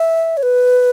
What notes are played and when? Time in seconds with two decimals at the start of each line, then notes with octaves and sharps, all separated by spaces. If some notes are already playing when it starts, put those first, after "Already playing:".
Already playing: E5
0.37 C#5
0.43 B4